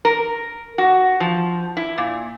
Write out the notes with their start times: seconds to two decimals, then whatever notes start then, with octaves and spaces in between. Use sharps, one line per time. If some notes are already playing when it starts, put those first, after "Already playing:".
0.05 A#4
0.78 F#4
1.20 F3
1.77 E4
1.98 A#2